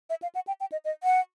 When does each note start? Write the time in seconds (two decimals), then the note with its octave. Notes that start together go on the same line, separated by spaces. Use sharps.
0.10 E5
0.22 F5
0.35 F#5
0.47 G5
0.60 G5
0.72 D#5
0.85 D#5
1.03 F#5